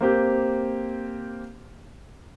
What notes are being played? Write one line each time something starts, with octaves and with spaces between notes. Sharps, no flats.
A#3 C4 G4